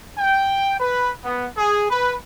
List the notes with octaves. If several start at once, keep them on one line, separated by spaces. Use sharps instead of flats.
G5
B4
B3
G#4
B4